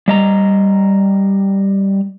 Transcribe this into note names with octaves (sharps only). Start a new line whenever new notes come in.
G3 D#5 A#5